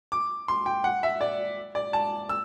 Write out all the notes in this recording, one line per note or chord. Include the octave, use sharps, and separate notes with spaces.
D6
C6
G5
F#5
E5
D5
D5
A5
E6